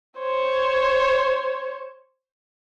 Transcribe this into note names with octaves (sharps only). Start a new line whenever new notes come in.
C5 C#5